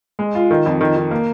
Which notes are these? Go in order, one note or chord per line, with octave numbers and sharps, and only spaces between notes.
G#3
F4
D#3
F2
D#3
D#3
A#3